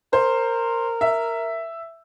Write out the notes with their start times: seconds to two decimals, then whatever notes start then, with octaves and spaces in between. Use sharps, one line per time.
0.13 A#4 C5
1.01 E5